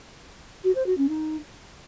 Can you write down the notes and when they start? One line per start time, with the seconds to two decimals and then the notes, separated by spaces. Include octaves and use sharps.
0.63 F#4
0.75 C5
0.86 F#4
0.97 C#4
1.08 D#4